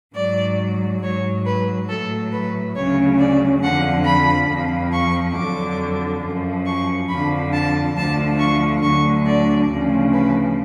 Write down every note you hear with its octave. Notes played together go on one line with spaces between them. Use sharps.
G#2 F#3 D5
G#2 F#3 C#5
B4
A2 F#3 A4
B4
D2 C#3 F#3 C#5
D5
F2 D3 F3 F#5
B5
F2 F3
C#6
F2 D3 F#3 D6
F#2 F3
C#6
F2 D3 F3 B5
A5
D2 D3 F3 A5
C#6
D2 D3 F#3 C#6
D5
D2 C#3 F3
B4